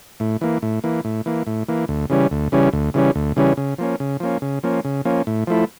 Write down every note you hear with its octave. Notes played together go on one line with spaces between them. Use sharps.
A2
E3 A#3
A2
E3 A#3
A2
E3 A#3
A2
E3 A#3
D2
C#3 E3 G3 C#4
D2
C#3 E3 G3 C#4
D2
C#3 E3 G3 C#4
D2
C#3 E3 G3 C#4
C#3
F3 A#3 C#4
C#3
F3 A#3 C#4
C#3
F3 A#3 C#4
C#3
F3 A#3 C#4
A2
F3 A3 E4